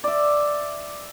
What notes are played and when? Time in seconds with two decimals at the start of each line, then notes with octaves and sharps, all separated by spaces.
0.04 D5 E5